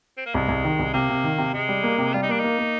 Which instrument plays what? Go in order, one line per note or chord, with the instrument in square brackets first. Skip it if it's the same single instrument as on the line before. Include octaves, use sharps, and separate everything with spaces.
[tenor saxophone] C4
A#3
[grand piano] C2 [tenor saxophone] G#3
[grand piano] C2
D#3
C2
[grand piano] C3 [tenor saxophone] A#3
[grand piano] C3
D#3
C3
[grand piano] C3 [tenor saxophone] G#3
[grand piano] G3
A#3
C3
[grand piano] G3 [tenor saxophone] F4
[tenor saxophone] D#4
[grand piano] A#3 [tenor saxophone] D4
[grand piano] A#3 [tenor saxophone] D#4
[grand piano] A#3